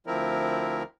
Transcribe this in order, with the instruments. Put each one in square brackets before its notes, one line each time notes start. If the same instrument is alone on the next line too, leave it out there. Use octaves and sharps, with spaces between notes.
[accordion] D2 F3 C4 E4 A#4